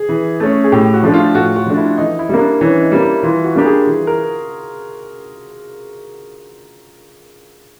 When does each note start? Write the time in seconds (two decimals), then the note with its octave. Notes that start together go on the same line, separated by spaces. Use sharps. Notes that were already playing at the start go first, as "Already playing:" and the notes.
Already playing: G#4
0.09 E3
0.40 A3 C#4
0.64 G#4
0.72 A2 G4
0.94 F#4
1.03 F3 A3 D4
1.14 F4
1.34 A2 F#4
1.56 F#4
1.66 F3 A3 D4
1.77 E4
1.97 E3 D#4
2.19 E4
2.29 G3 A#3
2.39 D4
2.61 E3 C#4
2.82 D#4
2.92 G3 A#3
3.02 E4
3.23 E3 F4
3.44 F#4
3.55 G3 A#3 D4 G4
3.66 G#4
3.87 E3
4.07 A#4